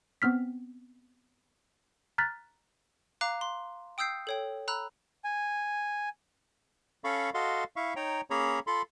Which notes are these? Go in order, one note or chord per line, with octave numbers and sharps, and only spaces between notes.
B3 C4 F6 B6
A#5 F6 F#6 A6 B6
F5 A#5 D6 F#6
C6
G5 D#6 E6 G6 C7
A4 C#5 G5
A#5 B5 E6 F#6
G#5
C#4 A4 F5 B5 C#6
F#4 A4 D#5 F5 C6
E4 E5 F5 C#6
D#4 C#5 G5 A#5
A#3 C#4 G#4 C#5 A#5 B5
F4 A4 B5 C6